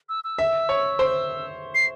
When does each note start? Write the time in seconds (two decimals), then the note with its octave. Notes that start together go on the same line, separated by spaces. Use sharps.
0.09 E6
0.24 E6
0.38 E5
0.69 C#5
0.99 C5
1.75 C7